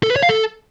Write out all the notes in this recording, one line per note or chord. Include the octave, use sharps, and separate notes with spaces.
A4
B4
C#5
F5
A4